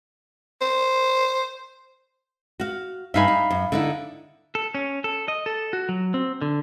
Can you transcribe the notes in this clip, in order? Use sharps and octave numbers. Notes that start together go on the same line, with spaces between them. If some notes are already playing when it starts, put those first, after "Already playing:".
C5
F#4 F5
G2 D#4 E5 F5 G#5 B5
D#4
F#2
D3 D#4 E4
A4
C#4
A4
D#5
A4
F#4
F#3
C4
D3